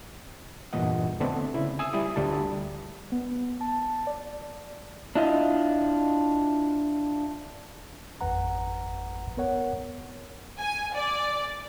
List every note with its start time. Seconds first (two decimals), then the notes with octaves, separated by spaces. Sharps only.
0.73 E2 G2 A#2 E3 D#5 F#5
1.20 D3 A3 B3 C4 D4
1.54 C#3 E4
1.79 G#5 D#6 E6
1.93 G3 E4 D#6
2.16 D2 D3 G3 A5
3.12 B3
3.61 A5
4.07 D5
5.15 D4 E4 F4 D#5
8.21 G#1 F2 B4 F#5 A#5
9.37 B3 A#4 C#5 F#5
10.59 G#5
10.94 D5